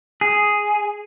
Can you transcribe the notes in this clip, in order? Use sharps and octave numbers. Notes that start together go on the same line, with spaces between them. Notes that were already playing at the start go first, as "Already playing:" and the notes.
G#4